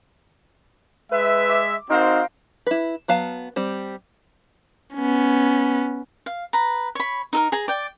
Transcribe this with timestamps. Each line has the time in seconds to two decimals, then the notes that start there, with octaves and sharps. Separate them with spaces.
1.12 G#3 B4 E5
1.49 D6
1.90 C4 D#4 F#4 A#4 C5 F5
2.67 E4 B4
3.08 F#3 B3 F5 A5
3.56 G3 C4
4.95 B3 C#4
6.26 F5
6.53 B4 A#5
6.95 C#5 B5
7.33 D#4 A4 A#4
7.52 G#4 A#5
7.68 D5 G5